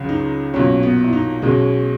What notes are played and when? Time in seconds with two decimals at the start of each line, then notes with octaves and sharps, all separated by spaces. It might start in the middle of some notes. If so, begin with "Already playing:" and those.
Already playing: C#2 C#3 F#3
0.09 D#4
0.54 B1 A#2 F#3 C#4
0.83 B3
1.04 E4
1.13 D#4
1.42 B1 B2 G#3 C#4